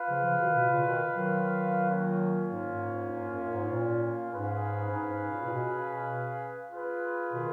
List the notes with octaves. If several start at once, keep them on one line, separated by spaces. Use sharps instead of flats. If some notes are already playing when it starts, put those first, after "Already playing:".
Already playing: F4 B4 F5
C#3 F3
C#3 F3
B2 D#3
B2
A#2 C#3
B2 D#3
D#3 F#3
A#3 C#4 F4
G#2
G#2
G#2
G#2
F#2
G#2
A#2
G#2 C#4 G#4 B4 F5
G#2
G#2
A#2
A#2
B2
F4 G#4 B4
B2 D#3